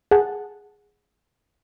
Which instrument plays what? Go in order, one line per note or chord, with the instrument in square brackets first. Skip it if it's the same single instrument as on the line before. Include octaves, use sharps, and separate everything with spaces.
[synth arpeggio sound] G#4 F#5 A5